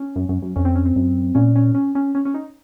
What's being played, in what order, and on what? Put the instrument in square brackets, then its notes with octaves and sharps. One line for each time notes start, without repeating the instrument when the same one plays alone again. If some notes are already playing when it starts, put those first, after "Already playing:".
Already playing: [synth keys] C#4
[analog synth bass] F#2
F#2
F#2
[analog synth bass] F2 [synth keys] C#4
[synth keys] C4
C#4
C4
[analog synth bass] F#2
[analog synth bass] A#2 [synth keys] C#4
[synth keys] C#4
C#4
C#4
C#4
C#4
D#4